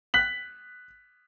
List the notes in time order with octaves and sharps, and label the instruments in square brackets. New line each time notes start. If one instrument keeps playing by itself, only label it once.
[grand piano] F#6 B6 F#7